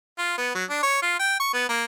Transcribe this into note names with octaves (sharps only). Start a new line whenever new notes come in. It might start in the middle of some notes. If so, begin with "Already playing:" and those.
F4
B3
F#3
D4
C#5
F4
G5
C#6
B3
A#3